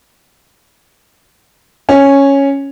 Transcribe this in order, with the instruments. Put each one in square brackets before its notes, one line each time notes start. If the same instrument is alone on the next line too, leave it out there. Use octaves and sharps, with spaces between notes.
[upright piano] C#4